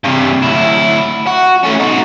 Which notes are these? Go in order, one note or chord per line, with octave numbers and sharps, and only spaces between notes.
G2 C3
D2 E4
F#4
A3 C#4
D#4 F#4